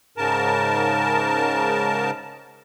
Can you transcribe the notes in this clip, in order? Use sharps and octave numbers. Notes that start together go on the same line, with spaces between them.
G#2 C#3 A#4 A5